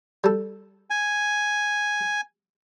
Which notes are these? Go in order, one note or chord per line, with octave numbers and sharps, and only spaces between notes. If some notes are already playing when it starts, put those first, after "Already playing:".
G3 A4
G#5